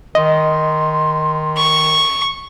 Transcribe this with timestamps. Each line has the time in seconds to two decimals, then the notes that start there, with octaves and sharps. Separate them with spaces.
0.15 D#3 D#5 C6
1.58 C#6